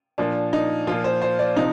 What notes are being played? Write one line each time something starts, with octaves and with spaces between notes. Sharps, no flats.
A#2 F3 D4
D#4
A#2 F3 F4
C5
C5
D5
C3 F3 D#4